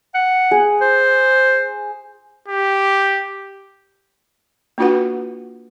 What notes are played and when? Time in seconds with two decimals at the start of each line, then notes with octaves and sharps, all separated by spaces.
0.15 F#5
0.51 G#4
0.81 C5
2.48 G4
4.78 A#3 D4 F4 F#4 B4 F#5